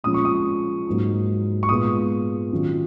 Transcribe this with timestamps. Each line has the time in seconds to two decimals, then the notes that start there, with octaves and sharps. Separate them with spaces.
0.04 A#2 F3 G#3 C#4 F4 D#6
0.14 C#6
0.25 D#6
0.87 G#2 F#3 A#3 D#4
1.63 C#6
1.69 A#2 G#3 B3 F4 D#6
2.52 D#3 F#3 C#4 F4